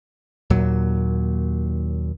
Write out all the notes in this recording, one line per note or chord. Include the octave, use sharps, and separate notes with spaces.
D#2 A#2 F#3